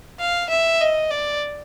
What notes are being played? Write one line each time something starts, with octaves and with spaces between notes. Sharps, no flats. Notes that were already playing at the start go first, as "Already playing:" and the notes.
F5
E5
D#5
D5